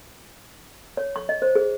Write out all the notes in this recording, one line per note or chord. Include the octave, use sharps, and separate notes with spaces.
C#5
C#6
D#5
C5
G#4